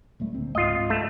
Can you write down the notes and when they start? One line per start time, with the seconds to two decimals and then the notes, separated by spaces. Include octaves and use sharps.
0.20 D#1 G3 A3
0.34 D2 C4
0.55 C#2 G#2 F4 D#5
0.90 A3